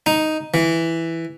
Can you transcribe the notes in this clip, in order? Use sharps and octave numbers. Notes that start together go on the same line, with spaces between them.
D#4
E3